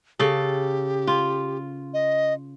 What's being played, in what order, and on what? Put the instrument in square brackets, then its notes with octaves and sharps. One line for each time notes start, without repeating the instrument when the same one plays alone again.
[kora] C#3 A4 [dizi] G4
[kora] F4
[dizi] D#5